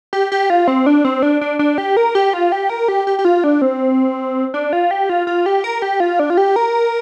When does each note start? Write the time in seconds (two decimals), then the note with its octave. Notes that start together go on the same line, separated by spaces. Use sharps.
0.13 G4
0.32 G4
0.50 F4
0.67 C4
0.86 D4
1.05 C4
1.22 D4
1.41 D4
1.59 D4
1.78 G4
1.97 A#4
2.15 G4
2.33 F4
2.52 G4
2.70 A#4
2.88 G4
3.07 G4
3.19 G4
3.25 F4
3.44 D4
3.62 C4
4.54 D4
4.73 F4
4.91 G4
5.09 F4
5.27 F4
5.46 G4
5.64 A#4
5.82 G4
6.00 F4
6.19 D4
6.30 F4
6.37 G4
6.56 A#4